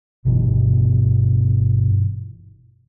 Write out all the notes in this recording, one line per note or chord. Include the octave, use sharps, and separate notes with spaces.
G1 G2 B2 E3